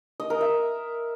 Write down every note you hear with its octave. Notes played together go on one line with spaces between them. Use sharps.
D#5
A#4
E5